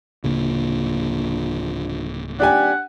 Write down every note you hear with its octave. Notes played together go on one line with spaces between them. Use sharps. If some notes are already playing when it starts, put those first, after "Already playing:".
D1 A#1 C#3 A#3
D#1 D4 G4 F#5 G#5